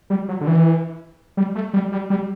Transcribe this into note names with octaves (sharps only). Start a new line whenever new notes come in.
G3
F#3
D3
E3
G3
A3
G3
G3
G3